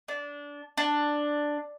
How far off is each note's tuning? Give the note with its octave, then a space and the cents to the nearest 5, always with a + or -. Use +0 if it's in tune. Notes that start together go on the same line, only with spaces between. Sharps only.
D4 -20
D4 +5